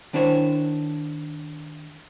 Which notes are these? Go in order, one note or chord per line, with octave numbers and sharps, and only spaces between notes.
D#3 D4 E4 C5 C#5